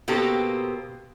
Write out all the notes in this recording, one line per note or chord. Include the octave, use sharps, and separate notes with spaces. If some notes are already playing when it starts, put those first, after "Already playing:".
B2 A#3 C4 G4 A4